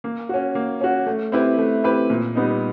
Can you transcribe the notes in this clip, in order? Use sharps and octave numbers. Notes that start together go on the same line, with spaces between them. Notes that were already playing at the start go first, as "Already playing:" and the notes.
A#3
C#4 F#4
A#3
C#4 F#4
A3
C4 E4 G4 B4
A3
C4 E4 G4 B4
A#2
G3 B3 D#4